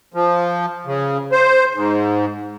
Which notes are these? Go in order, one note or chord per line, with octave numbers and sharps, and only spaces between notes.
F3
C#3
C5
G#2